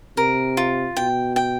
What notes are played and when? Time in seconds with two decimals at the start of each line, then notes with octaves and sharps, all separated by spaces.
0.17 C3 A#4
0.57 F4
0.96 B2 G5
1.36 G5